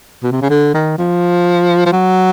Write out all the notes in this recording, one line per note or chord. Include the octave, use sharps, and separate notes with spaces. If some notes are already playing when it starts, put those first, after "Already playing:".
B2
C3
C#3
D3
D#3
F3
F3
F#3